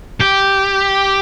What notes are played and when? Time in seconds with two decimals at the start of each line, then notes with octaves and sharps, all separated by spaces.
0.20 G4